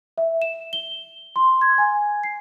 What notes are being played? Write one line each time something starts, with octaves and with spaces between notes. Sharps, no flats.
E5
E7
G7
C6
G#6
G#5
C7